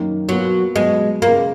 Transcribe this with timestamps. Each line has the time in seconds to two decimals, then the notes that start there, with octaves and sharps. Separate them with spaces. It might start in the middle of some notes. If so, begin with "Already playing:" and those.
Already playing: F#2 D#3 A#3 D#4
0.29 B2 F#3 A#3 F4 B4
0.76 B2 F#3 G#3 B3 F#4
1.22 C#3 G#3 A#3 B3 F4